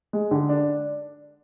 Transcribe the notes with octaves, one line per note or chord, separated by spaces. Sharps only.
G#3
D3
D4